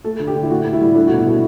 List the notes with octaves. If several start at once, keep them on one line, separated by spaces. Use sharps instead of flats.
A3 A4
D3
G4
D3
E4
A2 F#4
A2
E4
G3
A3 D4
F#4
B2
E4
B2